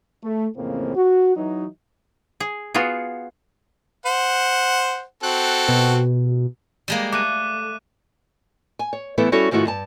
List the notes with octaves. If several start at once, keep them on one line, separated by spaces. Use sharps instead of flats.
A3
A1 F2 A2 C#3 A#3 C4
F#4
E3 F#3 D#4
G#4
B3 F4 F#4 G#4
C5 F#5
C4 F#4 A4 F#6
B2
G3 G#3 A#3
A3 D6 F#6 D#7
G#5
C#5
E3 A3 B3 E4 A4 E5
G3 C#4 E4 F#4 A4 C#5
G#2 D#3 F3 A3 E4 F#4
G2 A5